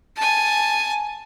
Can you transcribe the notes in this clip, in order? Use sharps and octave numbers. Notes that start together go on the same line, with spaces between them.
G#5 A5